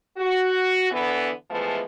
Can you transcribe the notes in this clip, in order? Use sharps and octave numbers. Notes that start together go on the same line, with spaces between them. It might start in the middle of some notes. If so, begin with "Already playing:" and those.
F#4
D3 E3 B3
E3 F3 G#3 A3 B3